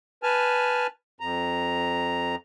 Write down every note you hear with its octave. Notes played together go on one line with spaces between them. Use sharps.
B4 G#5 A5 F6
F2 A#5